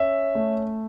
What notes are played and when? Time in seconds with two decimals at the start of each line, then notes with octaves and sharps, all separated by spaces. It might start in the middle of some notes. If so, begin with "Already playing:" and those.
Already playing: C#4 E5
0.35 A3